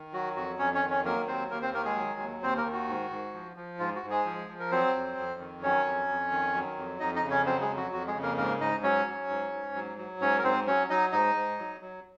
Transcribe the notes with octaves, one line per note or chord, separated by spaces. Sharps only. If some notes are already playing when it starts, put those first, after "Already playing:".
Already playing: D#3
F#3 F#4
F2 F#4
F2 C#4 C#5
C#4 C#5
D#3
C#4 C#5
F#3 A#3 A#4
D#2 C4 C5
D#2 A#3 A#4
C4 C5
D#3 A#3 A#4
G#3 G#4
F#3
D#2
D#2 C4 C5
A#3 A#4
D#3
F#4
G#2
G#2
F3
F3
G#2 F4
F#4
G#2
G#3 G#4
F3
F3
A#4
F#3 C4 C5
F2
F2
D#3
F#3 C#4 C#5
F2
F2
D#3
F#3
F2
F2 D#4 D#5
D#4 D#5
C#3
C#4 C#5
F#3 C4 C5
G#3 G#4
F2
F#4
F2 F#4
G#3 G#4
C#3
A#3 A#4
G#2 A#3 A#4
G#2 D#4 D#5
F#3 C#4 C#5
F#3
G#2
G#2
F#3
F#3
G#2 C#4 C#5
A#4
G#2 C4 C5
F#3 C#4 C#5
F#3 D#4 D#5
G#2 D#4 D#5
G#2
F#3
F#3